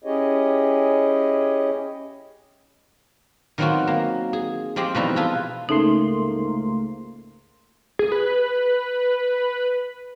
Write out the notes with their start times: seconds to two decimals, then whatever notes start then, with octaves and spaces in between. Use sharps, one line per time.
0.04 C#4 E4 G4 G#4 C#5 D#5
3.58 D#3 F#3 B3 C4 F4 F#4
3.87 A#3
4.33 G#4
4.76 F3 G#3 C4 G4
4.95 B2 E3 F3 G3 D#4 E4
5.16 F4 G#4 A4 B4
5.69 C#2 G#2 C#3 A3 A#3 D#4 C6
7.99 G#4
8.12 B4